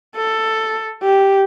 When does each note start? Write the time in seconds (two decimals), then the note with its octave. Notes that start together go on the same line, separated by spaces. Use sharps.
0.16 A4
1.03 G4